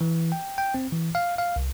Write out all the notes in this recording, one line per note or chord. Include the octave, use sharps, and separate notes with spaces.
E3
G5
G5
C4
E3
F5
F5
C2